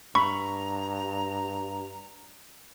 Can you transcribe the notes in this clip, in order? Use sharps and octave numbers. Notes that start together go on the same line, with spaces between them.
G2 A#5 B5 C#6